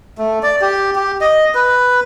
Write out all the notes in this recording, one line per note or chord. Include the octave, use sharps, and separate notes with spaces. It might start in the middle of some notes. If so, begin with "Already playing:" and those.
A3
D5
G4
G4
D#5
B4